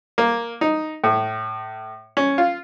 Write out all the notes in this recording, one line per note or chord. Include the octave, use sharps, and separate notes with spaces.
A#3
D#4
A2
C#4
F4